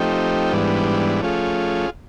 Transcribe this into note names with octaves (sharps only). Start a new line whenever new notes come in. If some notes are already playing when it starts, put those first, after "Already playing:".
Already playing: F3 A3 C4 D#4 G4
G#2 E3 G3 B3 D4
F3 A3 C#4 F4 G#4